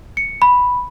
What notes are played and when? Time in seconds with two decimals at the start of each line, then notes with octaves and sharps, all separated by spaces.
0.17 C#7
0.42 B5